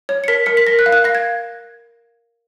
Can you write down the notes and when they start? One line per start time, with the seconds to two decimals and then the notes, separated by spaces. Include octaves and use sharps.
0.09 C#5
0.24 C#7
0.28 A#4 B6
0.46 A#4 C#7
0.57 B6
0.67 A#4 A#6
0.79 F#6
0.86 F5
0.92 F#6
1.04 F5 A#6
1.15 G#6